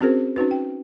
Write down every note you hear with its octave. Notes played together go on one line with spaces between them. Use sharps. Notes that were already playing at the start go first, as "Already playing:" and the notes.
C4 C#4 F#4 G#4 A#4 C5
C#4 D#4 F#4 B4
G5